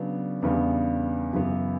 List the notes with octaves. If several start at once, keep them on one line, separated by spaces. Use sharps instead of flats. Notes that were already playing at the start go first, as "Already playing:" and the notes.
Already playing: C#3 F#3 B3 D4
E2 C#3 G3 B3 D4
F#2 C#3 E3 B3